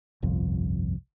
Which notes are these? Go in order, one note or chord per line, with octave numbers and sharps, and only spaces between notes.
G1 C2 F2